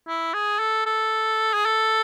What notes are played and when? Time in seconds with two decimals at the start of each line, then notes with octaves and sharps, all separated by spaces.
0.07 E4
0.34 G#4
0.59 A4
0.86 A4
1.54 G#4
1.65 A4